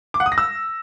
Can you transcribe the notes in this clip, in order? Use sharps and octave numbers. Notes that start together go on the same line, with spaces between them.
D6
F#5
D#6
A#6
E6